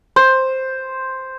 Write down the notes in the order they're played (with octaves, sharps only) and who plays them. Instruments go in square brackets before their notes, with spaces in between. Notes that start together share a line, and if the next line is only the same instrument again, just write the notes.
[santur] C5